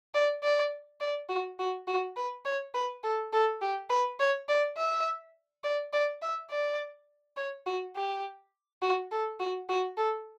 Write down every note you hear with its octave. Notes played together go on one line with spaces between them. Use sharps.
D5
D5
D5
F#4
F#4
F#4
B4
C#5
B4
A4
A4
G4
B4
C#5
D5
E5
D5
D5
E5
D5
C#5
F#4
G4
F#4
A4
F#4
F#4
A4